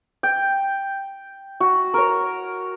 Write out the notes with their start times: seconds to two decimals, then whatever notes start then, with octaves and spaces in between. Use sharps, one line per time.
0.23 G5
1.60 F#4
1.94 A#4 C#5